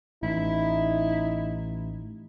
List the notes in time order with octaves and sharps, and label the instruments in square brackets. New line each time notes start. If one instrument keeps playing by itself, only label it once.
[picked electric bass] A1 [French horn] D#4 [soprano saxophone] E4